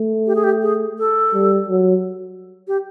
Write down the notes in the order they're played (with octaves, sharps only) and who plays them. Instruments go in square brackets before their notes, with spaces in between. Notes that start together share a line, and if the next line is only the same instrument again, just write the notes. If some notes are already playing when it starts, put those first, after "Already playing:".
Already playing: [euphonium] A3
[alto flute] G4
G#4
G4
G#4
A4
[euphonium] G3
F#3
[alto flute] G4